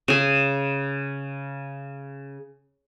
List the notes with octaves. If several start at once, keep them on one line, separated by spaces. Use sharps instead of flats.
C#3 G#4